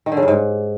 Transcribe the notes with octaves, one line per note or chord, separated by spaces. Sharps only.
D#3
D3
C#3
G2
G#2